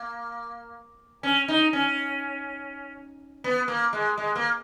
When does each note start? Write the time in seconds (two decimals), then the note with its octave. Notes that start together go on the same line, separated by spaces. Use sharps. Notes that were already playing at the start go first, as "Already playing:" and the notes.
Already playing: A#3
1.23 C#4
1.48 D#4
1.73 C#4
3.44 B3
3.68 A#3
3.93 G#3
4.18 G#3
4.35 A#3